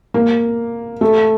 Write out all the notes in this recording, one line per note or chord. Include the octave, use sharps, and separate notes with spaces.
A#3
A3